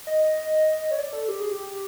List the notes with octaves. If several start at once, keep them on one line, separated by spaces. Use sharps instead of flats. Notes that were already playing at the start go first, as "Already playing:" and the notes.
D#5
C#5
D5
A4
G4
G#4
G4